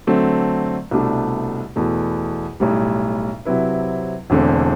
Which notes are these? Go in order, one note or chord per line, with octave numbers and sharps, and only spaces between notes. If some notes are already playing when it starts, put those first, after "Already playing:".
D3 F#3 A3 C4
C2 B2 A3 D4 G4
E2 B2 A3
B1 A2 G3
C3 F#3 C4 E4 B4
E1 E2 D3 A3 C4